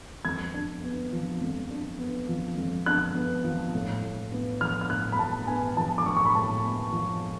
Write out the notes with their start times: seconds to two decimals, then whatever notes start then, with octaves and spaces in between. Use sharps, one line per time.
0.25 F2 G#6
0.54 D4
0.83 B3
1.13 F3
1.41 F2
1.71 D4
1.99 B3
2.29 F3
2.58 F2
2.86 D4 F#6
3.15 B3
3.44 F3
3.74 A2
4.03 A2
4.32 B3
4.61 F3 F6
4.81 F6
4.89 A2 F#6
5.12 B5
5.19 A2 A5
5.47 B3 G#5
5.77 F3 A5
5.98 D6
6.06 A2 C#6
6.17 C#6
6.25 B5
6.35 A2 A5
6.64 B3
6.92 F3